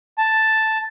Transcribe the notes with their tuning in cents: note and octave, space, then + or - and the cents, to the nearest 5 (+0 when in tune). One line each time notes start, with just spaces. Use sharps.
A5 +0